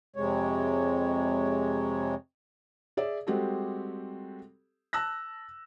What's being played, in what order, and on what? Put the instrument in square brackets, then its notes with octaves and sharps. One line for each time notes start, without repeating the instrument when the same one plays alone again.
[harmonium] F2 C3 G#3 C#5
[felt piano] G#4 D5 E5
G3 G#3 C4 F#4 G4 A4
A5 E6 F#6 A#6